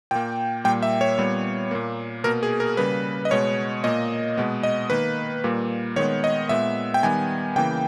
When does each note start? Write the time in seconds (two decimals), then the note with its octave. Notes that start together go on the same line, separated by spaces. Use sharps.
0.11 A#2 A#3 G5
0.64 A#2 G3 A#3 G5
0.83 E5
1.01 C#5
1.18 A#2 G3 B3
1.71 A#2 A#3
2.24 B2 A#3 A#4
2.43 G#4
2.60 A#4
2.77 C#3 G3 A#3 B4
3.25 D#5
3.31 B2 G#3 B3 C#5
3.84 A#2 A#3 D#5
4.37 B2 G#3 B3
4.63 D#5
4.90 D#3 A#3 B4
5.44 A#2 G3 A#3
5.96 D#3 G#3 B3 C#5
6.24 D#5
6.49 A#2 G#3 B3 E5
6.94 G5
7.03 D#3 G3 B3 G#5
7.56 C#3 E3 A#3 G5